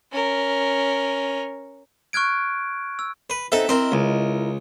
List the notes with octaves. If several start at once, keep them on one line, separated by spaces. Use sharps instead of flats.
C#4 A#4
C#6 F6 F#6 G#6 D7
E6
B4
B3 C4 D#4 A4 E5
C4 E4 A#4 D#5
C#2